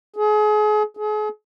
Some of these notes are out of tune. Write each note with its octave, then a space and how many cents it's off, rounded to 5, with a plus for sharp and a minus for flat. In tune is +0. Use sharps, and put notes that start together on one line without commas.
G#4 +35
G#4 +40